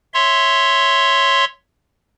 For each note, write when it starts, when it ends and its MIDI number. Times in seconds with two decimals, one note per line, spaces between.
0.14 1.45 73
0.14 1.45 76
0.14 1.45 84